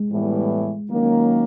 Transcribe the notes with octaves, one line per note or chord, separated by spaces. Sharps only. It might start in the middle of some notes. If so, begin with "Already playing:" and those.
Already playing: G#3
A2 E3 G3 B3 E4
D#3 F#3 A#3 C#4